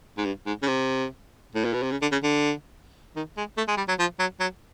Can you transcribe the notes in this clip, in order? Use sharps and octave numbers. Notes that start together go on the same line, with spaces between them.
G#2
G2
G#2
C#3
C3
A2
A#2
B2
C3
C#3
D3
C#3
D3
D#3
G#3
A3
G#3
G3
F#3
F3
F#3
F#3